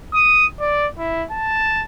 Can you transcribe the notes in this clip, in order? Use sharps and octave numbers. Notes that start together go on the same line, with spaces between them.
D#6
D5
E4
A5